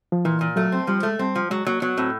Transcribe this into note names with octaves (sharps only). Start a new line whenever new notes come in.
F3
A#2 E3
A#2
F#3 A3
C4
F3 G3
G#3 A3
G3 C4
F3
F#3 G#3
F#3 A#3
F#3 B3
A2 C4